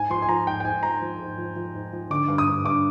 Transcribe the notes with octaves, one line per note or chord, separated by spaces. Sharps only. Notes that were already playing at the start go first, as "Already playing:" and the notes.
Already playing: G#2 G#5
F3 C6
G#5
F3 A#5
G#2 G5
G5
G#2 G#5
F3 A#5
F3
G#2
F3
F3
G#2
F3
D3 D6
G2
D#6
G2
G2 D6